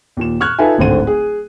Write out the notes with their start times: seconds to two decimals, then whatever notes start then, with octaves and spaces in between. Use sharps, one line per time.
0.17 D#2 A#2 E7
0.40 C#6 F6 F#6 G#6
0.59 D#4 F4 A4 B4 E5 G#5
0.78 D1 G#1 D3 C5 D#7
1.07 G#4